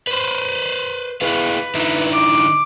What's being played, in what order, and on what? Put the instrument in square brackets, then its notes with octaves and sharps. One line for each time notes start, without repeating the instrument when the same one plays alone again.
[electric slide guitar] B4 C5
[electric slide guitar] E4 G#4 F5 [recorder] B4
[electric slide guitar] D3 D#4 E4
[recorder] D6